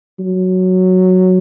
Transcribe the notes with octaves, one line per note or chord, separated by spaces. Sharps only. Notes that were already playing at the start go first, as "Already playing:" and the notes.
F#3